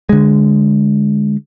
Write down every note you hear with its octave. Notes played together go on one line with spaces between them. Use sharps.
D3 G#3